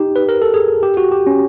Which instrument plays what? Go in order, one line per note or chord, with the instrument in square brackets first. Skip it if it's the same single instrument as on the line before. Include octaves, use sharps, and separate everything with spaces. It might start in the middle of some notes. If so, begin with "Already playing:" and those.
Already playing: [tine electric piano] D#4 G4
B4
A#4
A4
G#4
G4
F#4
G4
C#4